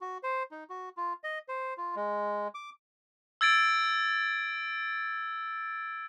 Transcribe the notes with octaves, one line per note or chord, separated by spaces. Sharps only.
F#4
C5
D#4
F#4
F4
D#5
C5
F4
G#3
D6
E6 G#6 A6 D7